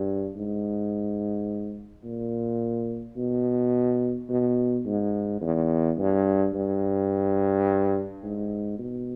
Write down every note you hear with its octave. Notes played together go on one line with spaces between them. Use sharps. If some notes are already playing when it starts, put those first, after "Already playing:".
Already playing: G2
G#2
A#2
B2
B2
G#2
E2
G2
G2
G#2
B2